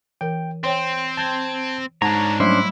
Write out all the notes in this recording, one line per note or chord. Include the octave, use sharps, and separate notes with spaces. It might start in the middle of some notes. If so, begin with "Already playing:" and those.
E3 A#4 G5
C4 C5 C#5 G5 C6
A5 G6 G#6
G#2 D4 C#5 F#5 A5 A#5
F#3 G3 A3 C#4 D4 E4 C5